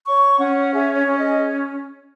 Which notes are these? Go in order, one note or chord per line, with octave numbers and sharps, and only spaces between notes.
C#5 C#6
C#4 F#5
G#4 E5
C#5
C#4
D#5